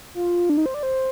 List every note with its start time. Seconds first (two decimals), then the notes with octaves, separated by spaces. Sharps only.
0.15 F4
0.49 D4
0.57 D#4
0.66 C5
0.74 D5
0.83 C5